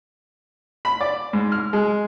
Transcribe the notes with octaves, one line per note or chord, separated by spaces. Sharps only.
B5
D5
G#2
F6
G#3